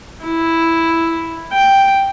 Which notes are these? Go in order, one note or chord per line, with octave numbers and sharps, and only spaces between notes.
E4
G5